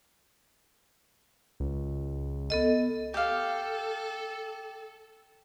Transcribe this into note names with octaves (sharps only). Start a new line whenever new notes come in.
C#2
B3 A4 D#5
G4 A4 F5